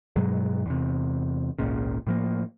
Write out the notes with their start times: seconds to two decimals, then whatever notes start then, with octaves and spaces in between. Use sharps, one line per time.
0.16 G2 B2 F#3 G#3
0.66 E2 C3
1.59 G#1 C#2 A#2 C#3
2.07 A2 F3 A#3